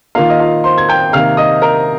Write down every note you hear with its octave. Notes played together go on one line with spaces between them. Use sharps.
D#3 A#3 F4 F5
D#5
F4 F5
C5 C6
G#6
G5 G6
C3 D#3 A#3 F5 F6
D#5 D#6
A#4 A#5